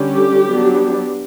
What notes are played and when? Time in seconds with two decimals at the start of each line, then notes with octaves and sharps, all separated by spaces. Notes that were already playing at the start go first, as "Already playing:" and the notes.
Already playing: D3 G3 C#4 G4
0.47 F#3 B3 D4